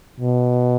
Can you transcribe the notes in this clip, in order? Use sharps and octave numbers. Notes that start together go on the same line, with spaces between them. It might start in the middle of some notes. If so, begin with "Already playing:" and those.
B2